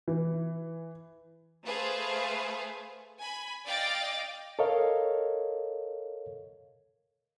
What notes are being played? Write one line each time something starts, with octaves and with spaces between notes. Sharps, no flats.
E3
A3 G#4 B4 C5 F5
G#5 B5
D5 D#5 F5 G5 D6 A6
A4 A#4 C#5 D#5 F5